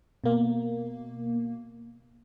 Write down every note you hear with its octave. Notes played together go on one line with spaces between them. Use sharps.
B2 A#3